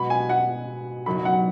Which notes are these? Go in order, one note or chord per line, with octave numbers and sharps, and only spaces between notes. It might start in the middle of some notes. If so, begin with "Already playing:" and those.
Already playing: B2 G#3 B3 F#4 B5
G#5
F#5
F#1 F#2 F#3 D#4 F#4 B5
F#5